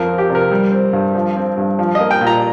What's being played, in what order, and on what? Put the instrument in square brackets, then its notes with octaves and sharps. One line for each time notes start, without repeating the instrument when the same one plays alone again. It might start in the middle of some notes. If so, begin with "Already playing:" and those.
Already playing: [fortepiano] F2 F3 A#4
C4
G4
C3
A#4
G3
C4
G2
F3
C4
G2
F3
D#5
A#3
G5
A#2
A#5